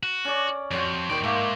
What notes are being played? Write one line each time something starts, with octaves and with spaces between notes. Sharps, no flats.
F#4
C#4 D5
F2 F#4 C5 C#5
D#2 D#3 C5 D5
G#2 A3 A#3